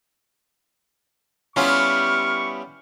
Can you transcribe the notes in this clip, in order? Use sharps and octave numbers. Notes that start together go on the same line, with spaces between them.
G3 B3 C#4 E4 F4 C#6 F6